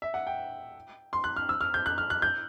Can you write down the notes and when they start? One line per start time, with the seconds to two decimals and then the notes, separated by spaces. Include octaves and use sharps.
0.02 E5
0.14 F#5
0.27 G5
1.13 C6
1.24 F#6
1.36 F6
1.49 E6
1.61 F6
1.74 G6
1.86 F#6
1.98 F6
2.10 F#6
2.22 G6